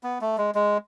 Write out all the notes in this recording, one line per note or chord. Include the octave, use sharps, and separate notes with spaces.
B3
A3
G#3
G#3